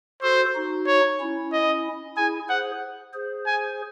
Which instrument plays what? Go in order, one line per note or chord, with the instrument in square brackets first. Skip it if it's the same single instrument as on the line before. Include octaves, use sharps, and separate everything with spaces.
[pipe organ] F#4 A4 [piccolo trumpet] C5
[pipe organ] D#4 F#4
[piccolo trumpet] C#5
[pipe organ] C#4 E4
[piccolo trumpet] D#5
[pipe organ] E4 G#4 [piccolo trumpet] G#5
[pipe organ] G#4 C5 [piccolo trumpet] F#5
[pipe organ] G#4 C5
[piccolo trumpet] G#5